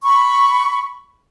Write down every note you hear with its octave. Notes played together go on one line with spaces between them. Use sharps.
B5 C#6